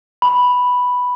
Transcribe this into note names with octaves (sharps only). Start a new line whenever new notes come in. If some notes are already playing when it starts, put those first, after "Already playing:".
B5